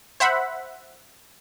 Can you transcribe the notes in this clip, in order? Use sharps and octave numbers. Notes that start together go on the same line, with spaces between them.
C5 E5 F#5 B5